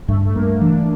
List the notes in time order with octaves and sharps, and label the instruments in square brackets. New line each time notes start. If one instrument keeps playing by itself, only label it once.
[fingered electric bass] G2 [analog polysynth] A3
[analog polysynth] A3
[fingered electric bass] G2 [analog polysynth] A#3
[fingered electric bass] E3 [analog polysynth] D4